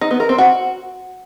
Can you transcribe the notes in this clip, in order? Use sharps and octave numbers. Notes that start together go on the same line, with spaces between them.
D#4
B3
A#4
C4
F#4